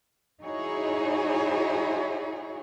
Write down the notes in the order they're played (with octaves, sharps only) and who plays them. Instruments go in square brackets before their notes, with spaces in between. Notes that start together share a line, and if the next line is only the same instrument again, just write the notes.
[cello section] D#4 E4 F#4 G#4 C#5